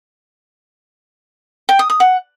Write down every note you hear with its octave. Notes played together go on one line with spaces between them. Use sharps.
G5
D#6
D#6
F#5